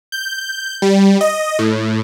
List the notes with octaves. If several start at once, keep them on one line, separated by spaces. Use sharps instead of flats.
G6
G3
D#5
A2